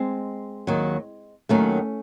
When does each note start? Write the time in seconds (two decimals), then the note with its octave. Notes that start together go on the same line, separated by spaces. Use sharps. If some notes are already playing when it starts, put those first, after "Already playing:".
Already playing: G#3 C4
0.67 D#2 D#3 F#3
1.49 D#2 D#3 F#3 A3 C#4